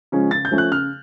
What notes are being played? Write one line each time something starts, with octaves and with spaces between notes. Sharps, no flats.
C#3 F3 G#3 C#4
C#3 A6
G6
F3 A3 C#4
F#6
C#3 F6